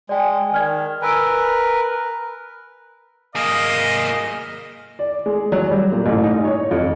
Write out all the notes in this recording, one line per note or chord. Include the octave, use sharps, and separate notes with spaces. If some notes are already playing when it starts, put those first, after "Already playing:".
G#3 D5 G5 G#5
D#3 D5 F6 G#6
A#4 B4 G#5 E6 D7
A#3 G#4 D#5 F5
D5
G#3
F#3
G3
A#2
A1
D#4
C#5
F2